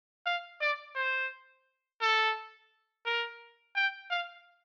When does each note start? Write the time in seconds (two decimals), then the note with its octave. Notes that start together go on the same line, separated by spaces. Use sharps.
0.26 F5
0.61 D5
0.95 C5
2.01 A4
3.06 A#4
3.76 G5
4.10 F5